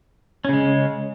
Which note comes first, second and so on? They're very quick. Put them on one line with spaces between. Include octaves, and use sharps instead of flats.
C#4 C#3 G#3